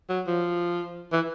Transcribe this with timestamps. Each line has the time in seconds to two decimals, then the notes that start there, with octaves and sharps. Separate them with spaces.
0.09 F#3
0.27 F3
1.12 E3